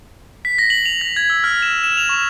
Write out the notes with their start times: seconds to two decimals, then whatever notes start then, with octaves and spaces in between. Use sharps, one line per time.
0.45 B6
0.58 A#6
0.70 F#7
0.86 F7
1.01 A#6
1.16 G#6
1.30 E6
1.44 F6
1.62 E7
1.84 E7
1.97 F7
2.09 C#6